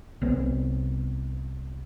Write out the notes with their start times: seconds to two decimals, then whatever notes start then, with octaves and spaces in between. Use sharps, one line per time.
0.22 C2 B3